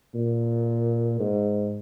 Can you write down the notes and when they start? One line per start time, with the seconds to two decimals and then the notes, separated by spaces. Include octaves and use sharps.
0.14 A#2
1.19 G#2